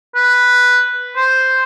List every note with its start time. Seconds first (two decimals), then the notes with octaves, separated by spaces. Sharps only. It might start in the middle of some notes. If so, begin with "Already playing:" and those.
0.15 B4
1.16 C5